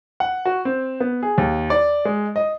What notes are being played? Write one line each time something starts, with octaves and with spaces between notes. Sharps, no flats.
F#5
F#4
C4
B3
G#4
D#2
D5
G#3
D#5